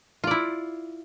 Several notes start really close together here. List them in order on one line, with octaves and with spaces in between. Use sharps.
F4 D5 E4